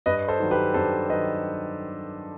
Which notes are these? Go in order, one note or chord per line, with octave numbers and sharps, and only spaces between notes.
G2 B4 D#5
A4 C5
D#3 F#3
G4 B4
G2 A4 C5
D#3 F#3 B4 D#5